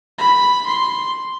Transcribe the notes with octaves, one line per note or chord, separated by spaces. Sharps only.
B5
C6